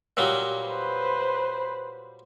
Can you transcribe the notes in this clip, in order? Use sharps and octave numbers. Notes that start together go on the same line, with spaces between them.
A#2 F#3 G3
B4 C5